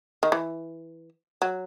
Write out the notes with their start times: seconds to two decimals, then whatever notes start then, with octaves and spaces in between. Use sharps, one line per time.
0.23 D#3
0.32 E3
1.42 F#3